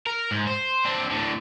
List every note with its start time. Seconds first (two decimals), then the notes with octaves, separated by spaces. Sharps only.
0.07 A#4
0.31 G#2
0.47 C5
0.85 C4 D4
1.11 A2 D3